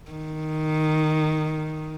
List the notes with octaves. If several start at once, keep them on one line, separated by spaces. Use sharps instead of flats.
D#3